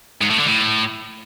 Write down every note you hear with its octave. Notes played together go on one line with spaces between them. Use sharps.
G#2
A2
D3
A2